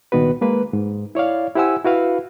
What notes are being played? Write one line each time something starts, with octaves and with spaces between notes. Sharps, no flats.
C2 A#2 D#3 B3 F#4 B4
G#3 A#3 B4
G#2
E4 C#5 D5 F5
E4 G4 C5 F#5 G#5 E6
E4 F#4 B4 F5